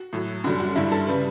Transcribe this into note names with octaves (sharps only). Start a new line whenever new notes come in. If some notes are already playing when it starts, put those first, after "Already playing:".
Already playing: F#4
A2 F#3
F#2 D3 G3 F#4
F#4
G2 D3 G3 E4
A4
C#3 G3 B4